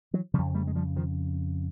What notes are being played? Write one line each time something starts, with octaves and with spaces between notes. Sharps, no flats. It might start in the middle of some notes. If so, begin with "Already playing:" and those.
E3 F#3
F2 C#3 F3 G3
G3 A3
G#3
F3 G3
D#3 F3